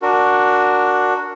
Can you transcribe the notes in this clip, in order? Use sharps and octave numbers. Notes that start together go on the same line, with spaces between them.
D4 F#4 A#4